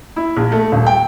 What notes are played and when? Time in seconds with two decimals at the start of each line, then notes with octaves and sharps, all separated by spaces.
0.16 E4
0.36 A#1
0.52 A3
0.72 D#1
0.86 G5